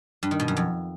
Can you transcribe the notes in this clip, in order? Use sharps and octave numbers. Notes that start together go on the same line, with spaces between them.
G2
D#3
B2
F#2
F2